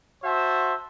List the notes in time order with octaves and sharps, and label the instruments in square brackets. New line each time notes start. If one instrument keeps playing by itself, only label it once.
[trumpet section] F#4 C5 E5 A5